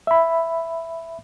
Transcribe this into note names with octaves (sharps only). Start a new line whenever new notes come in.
E5 B5